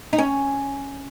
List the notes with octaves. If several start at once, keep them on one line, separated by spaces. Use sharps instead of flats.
D#4
C#4